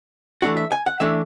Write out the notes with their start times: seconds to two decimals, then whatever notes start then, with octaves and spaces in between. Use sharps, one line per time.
0.42 E3 A3 D4 F#4
0.57 E5
0.72 G#5
0.86 F#5
1.00 E3 A3 D4 E5